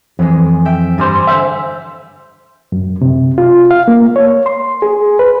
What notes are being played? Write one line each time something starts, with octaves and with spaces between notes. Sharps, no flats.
F2 E3 G#3
E5 G5
G2 G3 C5 G#5
D3 C5 E5
F#2
C3
F4
F5
A#3
C#5
C6
G#4
B4